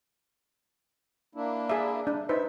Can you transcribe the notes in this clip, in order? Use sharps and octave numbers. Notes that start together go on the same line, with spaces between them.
A#3 D4 E4
G#4 D5 E5
D4
D#4 B4 C5 E5